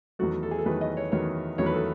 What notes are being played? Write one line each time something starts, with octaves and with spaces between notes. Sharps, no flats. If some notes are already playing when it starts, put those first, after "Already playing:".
E2 D#3 F#3 A3 F#4
A4
G#4
A4
E2 D#3 F#3 A3 B4
D#5
C#5
E2 D#3 F#3 A3 C#5
E2 D#3 F#3 A3 C#5
B4
A4